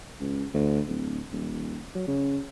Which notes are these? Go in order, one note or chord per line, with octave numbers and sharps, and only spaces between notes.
C#2
D2
D1
D#1
F#3
C#3